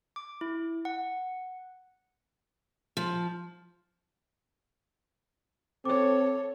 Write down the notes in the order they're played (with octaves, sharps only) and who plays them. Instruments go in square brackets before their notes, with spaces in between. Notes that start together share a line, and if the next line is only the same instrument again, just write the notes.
[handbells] D6
E4
F#5
[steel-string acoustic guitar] F3
[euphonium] C4 [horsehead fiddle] A4 C#5 [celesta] D6